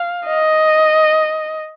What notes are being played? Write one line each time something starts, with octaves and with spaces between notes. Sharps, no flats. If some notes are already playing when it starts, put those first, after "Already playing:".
Already playing: F5
D#5